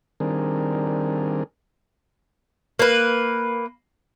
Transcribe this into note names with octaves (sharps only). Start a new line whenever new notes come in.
D#3 G3 C4 D4 G#4 A#4
A#3 B4